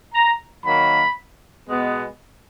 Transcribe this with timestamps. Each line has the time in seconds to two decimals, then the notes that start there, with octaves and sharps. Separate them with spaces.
0.14 A#5
0.65 D#3 F#3 A#3 B5
1.69 B2 G#3 B3